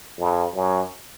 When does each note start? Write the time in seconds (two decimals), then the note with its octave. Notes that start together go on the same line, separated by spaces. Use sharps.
0.19 F2
0.55 F#2